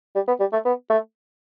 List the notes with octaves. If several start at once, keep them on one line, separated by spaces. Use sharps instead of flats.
G3
B3
G3
A3
B3
A3